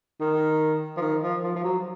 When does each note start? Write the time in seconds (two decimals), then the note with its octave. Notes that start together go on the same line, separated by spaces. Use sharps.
0.21 D#3
0.97 F3
1.02 D#3
1.23 F3
1.43 F3
1.56 F3
1.64 F#3